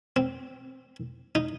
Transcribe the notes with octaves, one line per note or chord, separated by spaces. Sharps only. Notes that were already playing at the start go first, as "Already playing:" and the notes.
C4
D#4